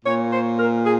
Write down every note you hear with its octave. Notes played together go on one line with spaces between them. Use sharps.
A#2 C#5
C5
A#4
G#4